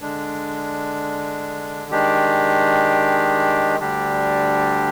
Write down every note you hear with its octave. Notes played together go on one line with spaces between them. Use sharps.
D3 G#3 D4
D#3 G#3 D4 G4
D2 D3 G3 D4 G4